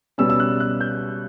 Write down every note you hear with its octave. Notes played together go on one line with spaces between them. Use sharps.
B2 G3 C#4 E6
E6
F#6
F#6
G6